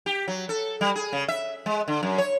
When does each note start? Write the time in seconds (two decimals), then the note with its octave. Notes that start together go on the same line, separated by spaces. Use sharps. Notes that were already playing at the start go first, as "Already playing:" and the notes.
0.06 G4
0.28 F#3
0.49 A4
0.81 G3
0.95 G#4
1.13 C#3
1.28 E5
1.66 G#3
1.88 D3
2.03 F#2
2.18 C#5